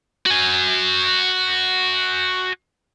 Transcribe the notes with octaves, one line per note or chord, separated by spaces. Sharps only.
F#4 G#5